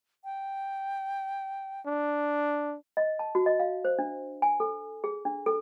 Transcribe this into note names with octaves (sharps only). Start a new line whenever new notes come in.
G5
D4
D#5
A5
F#4
D#5
F5
C5
D4
G#5
A4
G#4
D4
A4